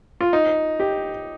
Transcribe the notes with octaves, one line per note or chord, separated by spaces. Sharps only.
F4
D#4
G4